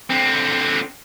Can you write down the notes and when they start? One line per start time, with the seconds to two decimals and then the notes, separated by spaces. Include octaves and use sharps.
0.10 D3 C4